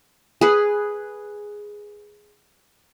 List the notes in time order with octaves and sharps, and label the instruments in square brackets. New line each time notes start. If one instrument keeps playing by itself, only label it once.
[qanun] G#4 B4